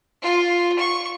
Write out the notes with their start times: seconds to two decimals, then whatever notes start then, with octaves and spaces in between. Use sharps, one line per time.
0.22 F4
0.78 C#6